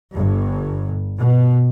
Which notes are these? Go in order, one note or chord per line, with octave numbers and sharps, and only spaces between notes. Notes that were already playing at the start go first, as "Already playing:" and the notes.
G1 G2
B2